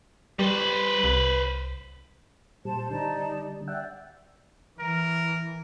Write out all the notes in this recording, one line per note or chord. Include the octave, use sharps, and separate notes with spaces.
G3 B4 C5
C2
A#2 G3 C5 A5
D3 G3 D#4 D5 A5
D5 E5 F#5 G5
E3 A#4